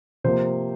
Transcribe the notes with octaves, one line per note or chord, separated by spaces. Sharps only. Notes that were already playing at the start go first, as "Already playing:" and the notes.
C3 F3 A#3 C5